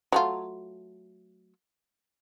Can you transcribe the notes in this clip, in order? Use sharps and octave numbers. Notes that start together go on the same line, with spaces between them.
F#3 A3 F4